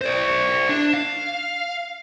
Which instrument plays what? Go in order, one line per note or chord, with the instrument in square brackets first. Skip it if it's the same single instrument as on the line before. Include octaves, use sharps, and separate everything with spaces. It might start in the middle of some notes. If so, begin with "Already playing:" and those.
[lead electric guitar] C5 D5
D4
F5